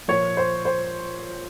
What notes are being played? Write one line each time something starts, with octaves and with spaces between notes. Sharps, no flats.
A#2 F3 C#5
C5
C5